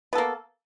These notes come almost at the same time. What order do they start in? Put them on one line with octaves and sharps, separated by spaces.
B3 A4 A#3